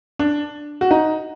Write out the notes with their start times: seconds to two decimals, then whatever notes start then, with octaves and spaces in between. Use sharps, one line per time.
0.19 D4
0.81 F#4
0.91 D#4